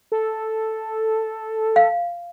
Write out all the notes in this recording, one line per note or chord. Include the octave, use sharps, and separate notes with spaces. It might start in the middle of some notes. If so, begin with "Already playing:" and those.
A4
F5